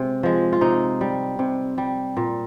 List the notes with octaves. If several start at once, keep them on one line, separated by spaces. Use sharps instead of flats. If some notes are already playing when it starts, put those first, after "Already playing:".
Already playing: C3 G#3
F3 G#3
F4
C3 D#4
G3
C3
G3
A#2